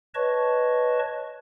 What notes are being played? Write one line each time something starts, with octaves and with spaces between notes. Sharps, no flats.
B4 C#5 D#5 A5 C#6